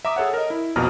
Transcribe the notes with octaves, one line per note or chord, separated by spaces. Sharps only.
E5 A#5 D6 D#6
G#4 A4 C#5 F#5
A#4 D#5
E4
A#1 F2 B2 A#3 A#5 F6